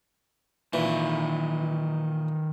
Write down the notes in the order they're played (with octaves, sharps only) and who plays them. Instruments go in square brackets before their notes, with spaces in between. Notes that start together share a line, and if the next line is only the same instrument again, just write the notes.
[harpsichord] A#2 E3 [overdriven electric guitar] D#3 B4